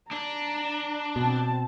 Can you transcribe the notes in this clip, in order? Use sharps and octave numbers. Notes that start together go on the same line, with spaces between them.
D4 A#5
B2 C4 A5